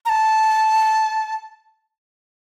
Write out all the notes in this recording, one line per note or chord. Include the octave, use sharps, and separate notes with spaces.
A#5
A5